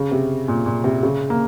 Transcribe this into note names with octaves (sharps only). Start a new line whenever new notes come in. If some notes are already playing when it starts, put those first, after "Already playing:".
Already playing: C#3
C3
A#2
A#2
C3
C#3
A#3